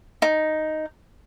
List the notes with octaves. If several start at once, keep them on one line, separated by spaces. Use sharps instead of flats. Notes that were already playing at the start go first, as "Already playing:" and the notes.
D#4